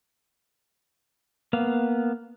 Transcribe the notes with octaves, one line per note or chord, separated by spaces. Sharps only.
A#3 B3 F5